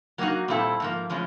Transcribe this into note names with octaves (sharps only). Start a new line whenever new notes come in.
F#3 A#3 D#4 F#4
A#2 G3 C4 E4 A4
G#2 F3 A#3
A2 F3 G#3 C#4